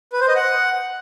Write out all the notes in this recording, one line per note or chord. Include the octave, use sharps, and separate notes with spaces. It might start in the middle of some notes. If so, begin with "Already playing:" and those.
B4
C5
D#5
F#5